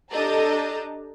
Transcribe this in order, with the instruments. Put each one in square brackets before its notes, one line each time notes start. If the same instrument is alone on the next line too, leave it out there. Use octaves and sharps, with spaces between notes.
[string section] D4 G4 A4 D#5 A5 A#5